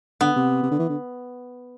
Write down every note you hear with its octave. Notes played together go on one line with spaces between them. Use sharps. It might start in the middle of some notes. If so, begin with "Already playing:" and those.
D3 B3
C3
C3
D3
E3
D3